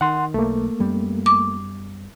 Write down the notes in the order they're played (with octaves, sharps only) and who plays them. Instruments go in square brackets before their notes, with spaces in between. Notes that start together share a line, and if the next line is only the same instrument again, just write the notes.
[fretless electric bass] D#3 [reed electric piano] F#5 C6
[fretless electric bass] B1 [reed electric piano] A3 A#3
[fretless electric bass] F#2 G3 B3
[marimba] D6